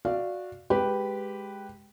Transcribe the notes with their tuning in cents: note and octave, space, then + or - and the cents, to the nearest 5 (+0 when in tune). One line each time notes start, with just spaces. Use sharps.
F#4 -15 D5 +0 F5 -20
G#3 -5 G4 -5 B4 +0